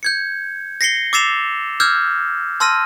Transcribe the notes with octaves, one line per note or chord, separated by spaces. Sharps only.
G6 G#6 C#7
A#6 C7 C#7 G7
D6 E6 A6 C7 E7 F7
D6 E6 F6 G6 G#6
A5 C6 E6 F6 A#6 D#7